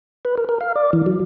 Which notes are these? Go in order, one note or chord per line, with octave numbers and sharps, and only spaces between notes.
B4
A#4
A#4
F5
D5
E3
F#3